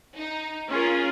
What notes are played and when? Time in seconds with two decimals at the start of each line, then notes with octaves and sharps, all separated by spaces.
0.19 D#4
0.69 C#4 F4 G#4 A#4